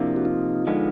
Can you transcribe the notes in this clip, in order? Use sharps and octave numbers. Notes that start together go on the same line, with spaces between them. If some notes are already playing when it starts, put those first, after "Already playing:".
Already playing: C3 F3 A#3 D4 E4
F#4
D#4 F4
D3 F3 G#3 B3